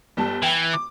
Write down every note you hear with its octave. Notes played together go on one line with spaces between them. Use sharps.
G1 G3 A5
E3 G5
D6